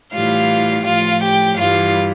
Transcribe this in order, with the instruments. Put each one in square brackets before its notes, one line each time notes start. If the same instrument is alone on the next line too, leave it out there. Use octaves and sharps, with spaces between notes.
[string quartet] A2 E3 G3 F4 F5
A2 F3 F4 F5
G4 G5
G2 E3 G3 F4 F5